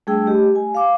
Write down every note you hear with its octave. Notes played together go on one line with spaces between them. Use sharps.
G3 A3 D4 G#4 G5 E6
A3 G4 D#5
G#5
F5 D6